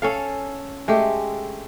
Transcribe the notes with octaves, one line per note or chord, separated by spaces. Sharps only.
C#4 A4 F5
G#3 A3 G4